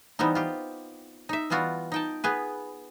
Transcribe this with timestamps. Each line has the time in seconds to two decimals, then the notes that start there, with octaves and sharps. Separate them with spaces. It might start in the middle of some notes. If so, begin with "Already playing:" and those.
0.19 E3 G3 B3 C4 D#4
0.35 F4 G4
1.29 D#4 E5
1.50 E3 G3 B3 F4 F#4
1.92 D#4 G5 A5
2.24 B3 G#4 B4